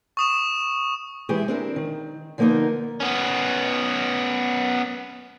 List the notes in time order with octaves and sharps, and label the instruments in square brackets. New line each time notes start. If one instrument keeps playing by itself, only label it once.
[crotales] C#6 D#6 E7
[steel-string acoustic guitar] E3 G#3 E4 G4 G#4
C4 D4 A#4
D#3
D3 F3 A#3 B3 D#4 A#4
[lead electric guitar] B3 C#4